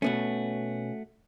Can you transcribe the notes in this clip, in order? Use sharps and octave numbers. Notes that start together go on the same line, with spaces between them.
B2 A3 B3 C#4 F#4